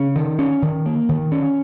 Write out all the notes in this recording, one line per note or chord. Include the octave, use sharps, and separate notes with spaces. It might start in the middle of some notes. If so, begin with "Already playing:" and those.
Already playing: C#3 C#4
D#3
C#4
D#3
A#3
D#3
C#4